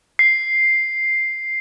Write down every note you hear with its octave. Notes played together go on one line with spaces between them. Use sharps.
C7